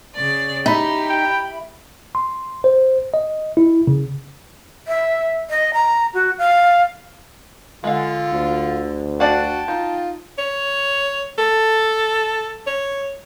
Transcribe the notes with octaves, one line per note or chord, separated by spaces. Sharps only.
C#3 D5
D#4 G4 E5 B5
G5
C6
C5
D#5
E4
C#3
E5
D#5
A#5
F#4
F5
D3 G#3 F4 F5
D2
D4 F#4 D5 F5 G5 A5
D#4 F4
C#5
A4
C#5